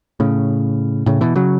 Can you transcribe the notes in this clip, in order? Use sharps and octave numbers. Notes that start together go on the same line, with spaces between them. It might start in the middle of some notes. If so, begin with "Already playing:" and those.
A2 C#3
A2 C#3
B2 E3
C#3 F#3